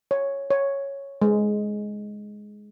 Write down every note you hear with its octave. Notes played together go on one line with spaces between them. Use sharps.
C#5
C#5
G#3